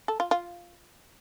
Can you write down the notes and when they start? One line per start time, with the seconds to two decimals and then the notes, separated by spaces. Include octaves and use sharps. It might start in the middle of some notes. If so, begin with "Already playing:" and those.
0.08 A4
0.20 F4
0.31 F4